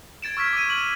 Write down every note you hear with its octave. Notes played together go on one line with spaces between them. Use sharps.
G#6 A6 D7 E7
C#6 E6 F6 G#6 B6
D6 E6 G#6 D#7
F#7